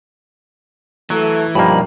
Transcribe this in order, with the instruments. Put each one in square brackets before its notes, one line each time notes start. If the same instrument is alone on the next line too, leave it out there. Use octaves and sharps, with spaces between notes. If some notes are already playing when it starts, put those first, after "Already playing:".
[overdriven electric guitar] E3 [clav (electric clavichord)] F#3 [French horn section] A3
[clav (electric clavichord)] G2 B2 A#3 [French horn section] D#3 [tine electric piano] F3 G3 D#4 [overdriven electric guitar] B5